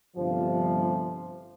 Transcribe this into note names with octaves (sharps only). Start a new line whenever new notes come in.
G1 G2 C3 F3